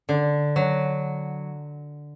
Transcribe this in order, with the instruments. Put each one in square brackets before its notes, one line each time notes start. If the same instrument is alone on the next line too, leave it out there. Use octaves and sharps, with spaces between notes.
[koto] D3
F#3